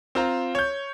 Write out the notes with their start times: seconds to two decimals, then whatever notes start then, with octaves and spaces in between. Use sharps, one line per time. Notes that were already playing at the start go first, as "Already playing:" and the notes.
0.15 C4 F4 A#5
0.55 C#5 G6